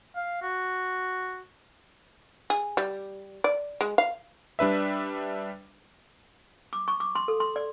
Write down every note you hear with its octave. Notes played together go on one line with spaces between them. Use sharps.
F5
F#4
G#4
G3
D5
G#3
F5
G3 D4 B4 E5
D6
C#6
D6
C6
A4
C6
D5